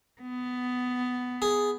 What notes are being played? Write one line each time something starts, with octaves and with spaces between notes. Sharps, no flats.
B3
G#4